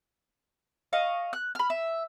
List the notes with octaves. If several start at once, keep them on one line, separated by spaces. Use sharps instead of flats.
D#5 F5 C#6
F#6
B5 F6
E5